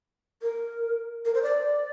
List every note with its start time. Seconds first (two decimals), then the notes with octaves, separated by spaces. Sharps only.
0.42 A#4
1.25 A#4
1.34 C5
1.43 D5